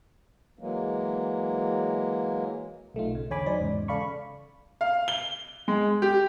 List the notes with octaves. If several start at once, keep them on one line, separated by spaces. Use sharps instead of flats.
E3 F#3 G#3 A#3
B1 A3 D#4 F4
C#3
E2 D3 C#5 G#5 B5 D6
F#3 D#4 C5 D5
E2 G#2 C#3
C#3 A4 D5 F5 B5 C#6
F5
G7
G#3
G4